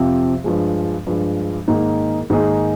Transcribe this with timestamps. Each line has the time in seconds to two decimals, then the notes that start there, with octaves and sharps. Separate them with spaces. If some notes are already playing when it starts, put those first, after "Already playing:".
Already playing: F2 C3 F3 C4 G4
0.44 G2 F3 G#3
1.07 G2 F3 G#3
1.68 G#2 D#3 A#3 D#4 G#4
2.30 G#2 D#3 A#3 D#4 G#4